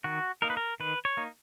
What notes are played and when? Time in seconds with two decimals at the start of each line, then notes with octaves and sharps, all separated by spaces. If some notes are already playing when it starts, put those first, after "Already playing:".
0.04 D#3 F#4
0.42 A#3 D#4 A#4
0.50 B4
0.57 A#4
0.80 D#3 B4
1.05 C#5
1.17 A#3 D#4